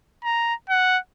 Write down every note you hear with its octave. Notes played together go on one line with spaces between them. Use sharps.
A#5
F#5